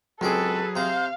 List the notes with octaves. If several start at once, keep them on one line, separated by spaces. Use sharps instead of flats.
C#2 F#3 C4 G#4 A4 B4 D6
C3 C5 F5 A#5